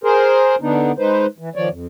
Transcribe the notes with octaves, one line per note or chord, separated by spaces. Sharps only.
G#4 A#4 C5
D3 B3 D4 D#4
G#3 D#4 B4 C5
E3
D#3 F3 C#5 D5
F2